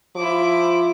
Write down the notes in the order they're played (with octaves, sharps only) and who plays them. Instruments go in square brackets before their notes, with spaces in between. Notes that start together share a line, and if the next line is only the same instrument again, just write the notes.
[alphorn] F3 [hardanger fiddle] E4 D6